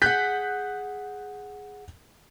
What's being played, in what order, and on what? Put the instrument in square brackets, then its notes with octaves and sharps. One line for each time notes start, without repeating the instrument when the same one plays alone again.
[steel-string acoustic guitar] G#4 F#5 [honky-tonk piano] F#6 G6 B6